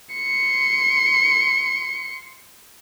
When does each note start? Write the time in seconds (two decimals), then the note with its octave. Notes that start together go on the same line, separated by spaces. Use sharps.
0.14 C6 C#7